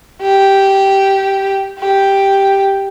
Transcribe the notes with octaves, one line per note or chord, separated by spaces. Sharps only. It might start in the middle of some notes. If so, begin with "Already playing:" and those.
G4
G4